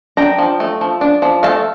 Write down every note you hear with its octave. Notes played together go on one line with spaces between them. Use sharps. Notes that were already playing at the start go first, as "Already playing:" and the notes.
D4 G5 A#5
F3
A3
F3
D4
F3
A3 F5 A5